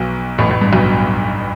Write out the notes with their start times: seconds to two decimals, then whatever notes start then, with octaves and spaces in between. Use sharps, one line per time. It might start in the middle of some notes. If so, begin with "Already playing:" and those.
Already playing: B1 B2
0.38 A1 A2
0.49 A1 A2
0.61 G2
0.72 B1 B2